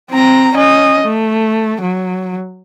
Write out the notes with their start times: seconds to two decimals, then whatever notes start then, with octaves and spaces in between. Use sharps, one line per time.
0.11 C4 A#5
0.55 C#4 D#5
1.04 A3
1.82 F#3